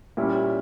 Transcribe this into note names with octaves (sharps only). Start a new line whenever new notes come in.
A#2 G3 C#4 E4